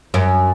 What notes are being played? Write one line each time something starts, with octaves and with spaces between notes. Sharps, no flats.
F#2